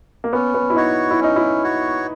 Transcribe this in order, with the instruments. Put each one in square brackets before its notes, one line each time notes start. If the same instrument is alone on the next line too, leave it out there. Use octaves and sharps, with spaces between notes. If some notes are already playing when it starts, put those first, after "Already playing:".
[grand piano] A#3
[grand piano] B3 [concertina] C#4
[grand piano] B3
E4
[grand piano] D#4 [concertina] F#4 C#5
[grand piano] E4
[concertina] C#4 [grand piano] D#4
[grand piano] E4
[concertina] F#4 C#5